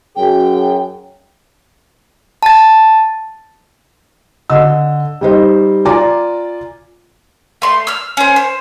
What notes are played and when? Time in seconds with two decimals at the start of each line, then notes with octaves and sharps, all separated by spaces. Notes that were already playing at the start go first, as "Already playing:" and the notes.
0.16 F#2 G#4 G5
2.43 A5 A6
4.50 D3 D#5 E6
5.21 G3 D#4 C5 D#5
5.85 F4 D5 G#5 A#5 D6
7.62 A3 C6
7.87 E6 F6
8.17 C#4 C5
8.36 C5